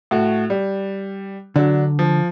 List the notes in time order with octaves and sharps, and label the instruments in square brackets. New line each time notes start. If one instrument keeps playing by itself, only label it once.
[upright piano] A2 F#4
G3
[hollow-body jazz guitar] D3 [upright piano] F#3 D4
[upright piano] F3